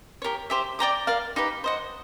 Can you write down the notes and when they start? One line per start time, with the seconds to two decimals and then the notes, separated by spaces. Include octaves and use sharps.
0.22 G4 A#4 C#5
0.50 G4 C5 E5
0.79 D5 G5 A#5 D6
1.07 A#4 D5 F5
1.36 D#4 G4 B4
1.64 C5 D#5 F#5